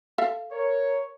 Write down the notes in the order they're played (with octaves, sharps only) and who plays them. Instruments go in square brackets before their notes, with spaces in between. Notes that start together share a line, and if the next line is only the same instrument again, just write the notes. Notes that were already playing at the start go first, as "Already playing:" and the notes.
[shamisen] A4 E5 F5
[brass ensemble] A#4 C#5